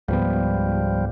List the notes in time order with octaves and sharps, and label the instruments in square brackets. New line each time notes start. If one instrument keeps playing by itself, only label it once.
[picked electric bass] C#2 G#2 B3 [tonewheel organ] F3 G3